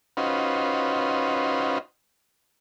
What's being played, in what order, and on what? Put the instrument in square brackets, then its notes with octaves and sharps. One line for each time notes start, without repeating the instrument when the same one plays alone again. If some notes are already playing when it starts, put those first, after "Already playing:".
[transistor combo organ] C#4 D#4 F4 F#4 B4 C5